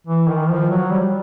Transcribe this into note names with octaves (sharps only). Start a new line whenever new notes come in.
E3
D#3
F3
F#3
G3